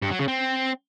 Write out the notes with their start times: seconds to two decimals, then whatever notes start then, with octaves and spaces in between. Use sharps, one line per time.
0.03 G2
0.11 F#3
0.19 C#3
0.28 C4